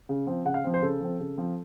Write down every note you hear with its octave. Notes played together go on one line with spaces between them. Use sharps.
C#3
F3 C4
C#3 F#5
F5
F3 C4
C5
C#3 A4
F3 C4
C#3
F3 C4